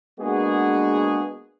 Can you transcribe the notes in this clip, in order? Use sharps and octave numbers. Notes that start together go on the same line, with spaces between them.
G#3 A#3 B3 D4 F#4 G#4